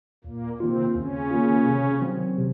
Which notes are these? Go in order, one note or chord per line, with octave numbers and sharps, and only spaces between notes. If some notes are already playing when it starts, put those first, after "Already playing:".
D#2 A#2 A#3
C3 D#3 A#3 C4 F4
D#2 C#3 C#4
D#3 A#3 F4
C3
D#3 F#3 C4
C3